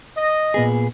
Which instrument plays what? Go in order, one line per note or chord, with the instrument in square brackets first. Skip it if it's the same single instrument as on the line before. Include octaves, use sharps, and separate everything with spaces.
[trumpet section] D#5
[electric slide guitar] A#2 B3 G#4